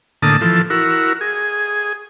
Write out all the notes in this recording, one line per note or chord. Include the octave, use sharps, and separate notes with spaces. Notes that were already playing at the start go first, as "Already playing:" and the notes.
A2 D3 A#3 A5 D#6
E3 F3 A4
E4 F#4 A#4
G#4